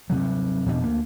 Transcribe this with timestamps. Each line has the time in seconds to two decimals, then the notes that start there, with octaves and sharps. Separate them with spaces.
0.10 G2 C3 F#3
0.66 E2 B2 D4
0.80 D2 A#3